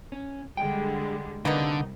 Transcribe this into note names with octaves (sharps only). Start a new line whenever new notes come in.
C#4
D3 G3 G#3 G5
C2 D3 A#3 B3 D#4